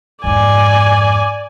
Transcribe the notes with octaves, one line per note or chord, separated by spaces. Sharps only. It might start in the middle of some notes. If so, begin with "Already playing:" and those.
F2 G#2 D5 G#5